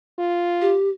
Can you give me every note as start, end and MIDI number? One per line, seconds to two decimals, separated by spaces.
0.19 0.75 65
0.61 0.89 67